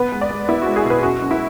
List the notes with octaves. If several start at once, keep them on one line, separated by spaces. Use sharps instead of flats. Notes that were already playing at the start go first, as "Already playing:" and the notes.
Already playing: B3 B4
G#3
D5
G#3
B3 E4
G#3 F#4
G#4
B2
B4
F#2 F#4
F#2
E4